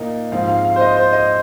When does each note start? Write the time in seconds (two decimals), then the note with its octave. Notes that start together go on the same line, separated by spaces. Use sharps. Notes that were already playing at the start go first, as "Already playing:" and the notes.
Already playing: A#2 A#3 D#4
0.32 G#2 F3 C4 F5
0.48 F5
0.65 F5
0.76 C5
0.81 D#5
0.97 C5
1.13 D#5